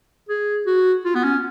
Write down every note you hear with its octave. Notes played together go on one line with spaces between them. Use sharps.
G#4
F#4
F4
B3
C#4